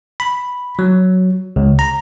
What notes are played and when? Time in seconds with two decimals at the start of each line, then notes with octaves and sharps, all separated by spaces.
0.20 B5
0.79 F#3
1.56 C#2
1.79 A#5